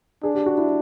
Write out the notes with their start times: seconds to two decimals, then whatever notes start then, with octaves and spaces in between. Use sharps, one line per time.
0.23 D4 G#4
0.35 G4
0.46 F#4
0.58 E4